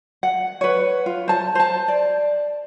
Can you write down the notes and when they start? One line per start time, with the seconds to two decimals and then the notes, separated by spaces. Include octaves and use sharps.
0.23 F#5
0.61 B4 C#5
1.06 F4
1.28 C5 A5
1.55 C5 A5
1.88 D5